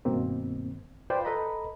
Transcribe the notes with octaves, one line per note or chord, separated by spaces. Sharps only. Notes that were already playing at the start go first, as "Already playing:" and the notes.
G2 B2 D#3 A#3 C4
F4 B4 C5 D5 G5
A4 B4 D#5 A#5 B5